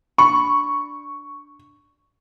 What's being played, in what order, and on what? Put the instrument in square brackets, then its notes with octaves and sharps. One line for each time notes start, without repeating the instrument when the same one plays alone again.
[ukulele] D4 B5 [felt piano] C#6